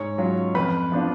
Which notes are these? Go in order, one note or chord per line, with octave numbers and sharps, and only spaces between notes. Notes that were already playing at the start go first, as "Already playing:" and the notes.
Already playing: G#2 C#5 C#6
F#3 C#4 F4
F2 B4 B5
F3 B3 D4 F4